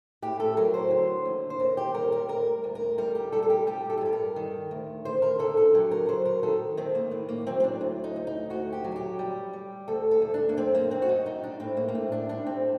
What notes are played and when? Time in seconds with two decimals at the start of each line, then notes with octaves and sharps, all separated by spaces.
0.22 A2 G4
0.40 A4
0.57 F#3 A#4
0.74 C5
0.91 D3
1.25 D#2
1.50 C5
1.60 D#2 A#4
1.77 G4
1.94 G3 A#4
2.12 A#4
2.28 D2 A#4
2.64 D2
2.75 A#4
2.98 G3 A#4
3.15 G4
3.32 G3 A4
3.43 A4
3.50 G4
3.67 G3 G4
3.90 A4
3.97 G4
4.01 G2 A4
4.13 A#4
4.36 D#3
4.71 D2
5.05 D2 C5
5.22 A#4
5.39 D3 A4
5.57 A4
5.74 F#3 G4
5.91 A#4
6.09 F#3 C5
6.25 A#4
6.43 D#3 A4
6.77 D#3 C4
6.95 A#3
7.11 A2
7.29 A#3
7.46 F#3 C4
7.60 C4
7.64 D4
7.81 D2
8.04 D#4
8.16 D2
8.27 D#4
8.50 D2 F#4
8.73 G4
8.84 F#3
8.92 A4
8.96 G4
9.19 G3
9.53 G3
9.88 D2 A4
10.11 A4
10.22 D2
10.34 D4
10.49 A#3
10.57 F#2 C4
10.75 A#3
10.90 F#2 C4
11.02 F#4
11.09 D#4
11.26 G3 D#4
11.44 D4
11.60 A2 C4
11.77 A#3
11.88 A#3
11.95 A2 C4
12.12 D4
12.29 G3 D4
12.46 C4